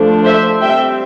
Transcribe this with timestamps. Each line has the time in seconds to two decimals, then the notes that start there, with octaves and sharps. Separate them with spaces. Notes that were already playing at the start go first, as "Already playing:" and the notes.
Already playing: D3 F3 A3 D4
0.25 C5 E5
0.61 G3 C4 E5 G5